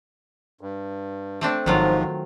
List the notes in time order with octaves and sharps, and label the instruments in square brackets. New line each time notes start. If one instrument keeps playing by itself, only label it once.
[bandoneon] G2
[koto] A3 C4 D4
[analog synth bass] G#1 [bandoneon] G#2 F3 [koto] D#3 F#3 F4